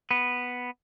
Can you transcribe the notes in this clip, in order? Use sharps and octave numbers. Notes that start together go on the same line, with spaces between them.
B3